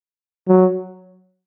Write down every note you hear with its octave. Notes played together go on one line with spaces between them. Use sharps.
F#3